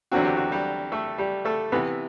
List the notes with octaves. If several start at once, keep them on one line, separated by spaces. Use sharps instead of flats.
E2 D3 F#3 C4 F#4
G4
F#4
G3 G4
A3 A4
G3 G4
A3 A4
C3 E3 B3 B4